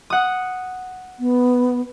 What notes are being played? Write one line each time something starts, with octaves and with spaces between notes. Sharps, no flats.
F#5 D#6
B3